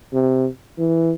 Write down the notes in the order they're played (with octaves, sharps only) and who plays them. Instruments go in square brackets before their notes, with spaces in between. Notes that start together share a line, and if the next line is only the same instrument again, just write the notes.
[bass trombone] C3
E3